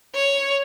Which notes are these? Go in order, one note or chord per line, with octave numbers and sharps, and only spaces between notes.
C#5